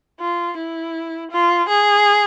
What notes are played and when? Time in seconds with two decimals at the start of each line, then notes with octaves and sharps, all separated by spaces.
0.20 F4
0.57 E4
1.31 F4
1.69 G#4